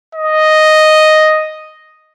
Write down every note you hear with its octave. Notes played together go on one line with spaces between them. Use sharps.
D#5